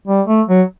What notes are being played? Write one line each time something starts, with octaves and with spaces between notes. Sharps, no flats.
G3
A3
F#3